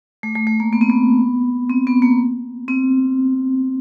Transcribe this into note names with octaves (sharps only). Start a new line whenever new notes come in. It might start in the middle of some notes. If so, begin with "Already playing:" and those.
A3
A3
A3
A#3
B3
C4
B3
C4
B3
A#3
C4